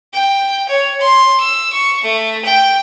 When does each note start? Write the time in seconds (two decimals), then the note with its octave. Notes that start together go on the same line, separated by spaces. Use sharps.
0.13 G5
0.68 C#5
1.01 C6
1.40 E6
1.73 C#6
2.03 A3
2.45 G5